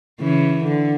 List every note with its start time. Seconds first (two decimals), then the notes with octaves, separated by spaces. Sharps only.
0.21 C#3 E3
0.64 D3